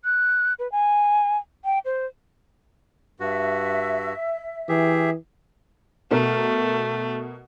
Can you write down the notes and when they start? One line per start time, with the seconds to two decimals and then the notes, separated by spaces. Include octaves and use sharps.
0.05 F#6
0.59 B4
0.72 G#5
1.65 G5
1.85 C5
3.20 G2 F#4 E5
4.69 E3 G4 G#4 E5
6.11 B2 A3 A#4